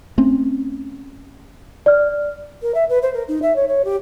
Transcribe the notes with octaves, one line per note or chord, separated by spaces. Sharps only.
A3 C4 C#4
D5 F6
A#4
E5
B4
C5
A#4
D#4
E5
C#5
C#5
G4